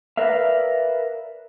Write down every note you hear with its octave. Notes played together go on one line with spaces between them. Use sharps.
A#4 B4 D5 E5 F5